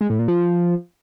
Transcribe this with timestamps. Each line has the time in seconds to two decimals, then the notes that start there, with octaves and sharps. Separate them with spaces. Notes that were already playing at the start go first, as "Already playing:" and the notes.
0.01 G#3
0.10 A2
0.19 A#2
0.28 F3